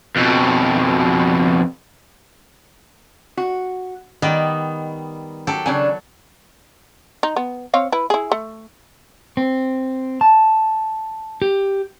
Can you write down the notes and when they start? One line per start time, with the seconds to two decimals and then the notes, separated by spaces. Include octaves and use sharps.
0.17 F2 B2
3.37 F#4
4.22 D#3 G3 B3 D#5
5.47 F#3 G4 A4
5.66 C#3 F#3 D4 G#5
7.23 D#4
7.36 B3
7.74 C4 C#5 F5
7.92 E4 B4
8.10 E4 G#4
8.32 A3
9.37 C4
10.21 A5
11.42 G4